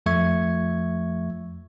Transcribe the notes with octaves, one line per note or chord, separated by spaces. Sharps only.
F2 F3 A3 E5 C#6 G#6